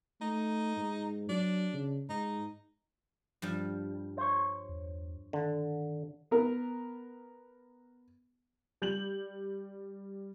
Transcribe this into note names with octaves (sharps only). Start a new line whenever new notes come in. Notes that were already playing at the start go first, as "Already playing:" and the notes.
A3 D#4
G#2
F#3 D4
C#3
G#2 D#4
G2 F3 G3
C5 C#5
E2
D3 D#3
B3 A#4
G3 G6 F7 F#7